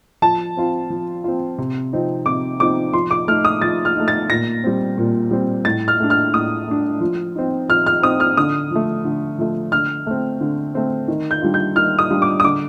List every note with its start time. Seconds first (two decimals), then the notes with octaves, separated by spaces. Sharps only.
0.22 F3 A5
0.57 C4 F4
0.90 F3
1.24 C4 F4
1.58 C3
1.93 F3 C4 D#4
2.26 C3 D6
2.60 F3 C4 D#4 D6
2.93 F3 C6
3.11 D6
3.28 A3 D#4 F6
3.45 D#6
3.62 F3 A6
3.85 F6
3.95 A3 D#4
4.08 A6
4.29 A#2 A#6
4.64 G3 C4
4.98 A#2
5.31 G3 C4
5.65 A2 A6
5.88 F6
6.00 A3 D4
6.10 F6
6.33 A2 D#6
6.68 A3 D4
7.01 F3
7.35 C4 D#4
7.68 F3 F6
7.86 F6
8.02 C4 D#4 D#6
8.20 F6
8.37 D3 D#6
8.71 F3 A3
9.05 D3
9.38 F3 A3
9.72 D3 F6
10.06 A3 C4
10.41 D3
10.75 A3 C4
11.08 D#3
11.31 G6
11.42 G3 D4 F4
11.54 G6
11.76 D#3 F6
11.99 D#6
12.10 G3 D4 F4
12.22 D6
12.40 D#6
12.44 D3 D6